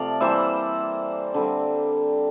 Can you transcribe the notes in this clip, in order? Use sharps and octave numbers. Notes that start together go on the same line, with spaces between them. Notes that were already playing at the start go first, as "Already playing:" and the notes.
Already playing: C3 F3 A3 D5 F5
E3 G3 A#3 C5 E5
D3 G3 C4